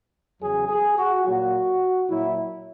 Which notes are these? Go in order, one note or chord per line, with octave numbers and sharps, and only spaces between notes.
E2 C#3 F#3 G#4
G#4
F#4
A#2 F#3 F#4
A#2 F#3 E4